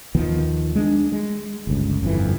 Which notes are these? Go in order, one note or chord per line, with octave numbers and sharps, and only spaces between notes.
D#2 D#3 F3 B3
G#3 B3 D4
G#3
G1 C#2
G1 F2 B2 E3